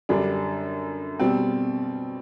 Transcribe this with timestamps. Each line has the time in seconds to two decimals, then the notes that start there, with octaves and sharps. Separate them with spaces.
0.09 F#2 D3 G3 D4
1.19 B2 G3 C4